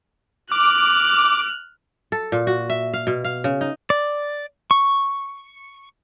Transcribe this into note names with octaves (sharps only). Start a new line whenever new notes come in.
D6 F6 F#6
A4
A#2
F#4
E5
F5
B2
F5
C#3
D#4
D5
C#6